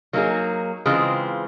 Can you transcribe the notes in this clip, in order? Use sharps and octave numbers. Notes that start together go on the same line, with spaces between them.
F#3 A#3 D#4 G#4
C#3 E3 G#3 C4 F4